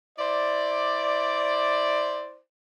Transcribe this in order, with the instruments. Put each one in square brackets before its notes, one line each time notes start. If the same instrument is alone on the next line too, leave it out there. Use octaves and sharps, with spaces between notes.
[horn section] E4 C5 D5